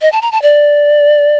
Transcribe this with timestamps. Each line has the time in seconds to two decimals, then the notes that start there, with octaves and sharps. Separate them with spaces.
0.02 D#5
0.12 A5
0.22 A#5
0.32 A5
0.42 D5